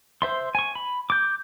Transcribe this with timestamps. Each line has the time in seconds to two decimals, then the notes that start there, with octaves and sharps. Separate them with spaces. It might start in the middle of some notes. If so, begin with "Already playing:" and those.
0.22 C5 E5 C6
0.55 G#5 C#6
0.75 B5
1.10 D6 G6